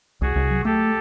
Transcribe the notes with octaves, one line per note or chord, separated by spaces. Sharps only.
C2 F#4 G#4
C2
F#3
A3 G4 A4